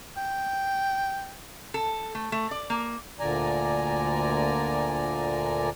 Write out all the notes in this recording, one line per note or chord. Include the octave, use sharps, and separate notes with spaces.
G5
A4
A3
A3
D5
A#3
D2 A#2 D3 D5 G#5 A#5